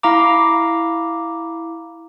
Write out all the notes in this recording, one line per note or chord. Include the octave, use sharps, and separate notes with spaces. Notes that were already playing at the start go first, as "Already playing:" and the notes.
E4 F5 A#5 D6